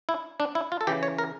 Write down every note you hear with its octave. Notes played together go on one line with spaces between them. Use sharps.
E4
D4
E4
F4
A4
C#3 E3 G4
C#5
A#4